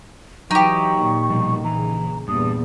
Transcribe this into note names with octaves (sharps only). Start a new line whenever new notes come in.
E3 F#3 D#4 G4 C#6
A#2 D#3
B2 F3 G3
A#1 C#3 E3 A#5
E2 G2 A#2 D#6